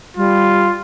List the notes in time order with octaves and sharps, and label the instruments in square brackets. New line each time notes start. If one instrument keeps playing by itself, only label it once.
[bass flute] G3 [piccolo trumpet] F4